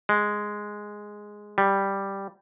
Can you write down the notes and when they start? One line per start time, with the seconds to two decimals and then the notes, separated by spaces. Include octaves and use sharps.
0.09 G#3
1.58 G3